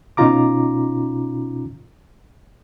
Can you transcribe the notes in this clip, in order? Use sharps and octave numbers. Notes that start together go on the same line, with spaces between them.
B2 C#4 D#4 F4 A#5 D6